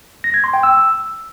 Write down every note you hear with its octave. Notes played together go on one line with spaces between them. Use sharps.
A#6
G#6
C6
G5
E6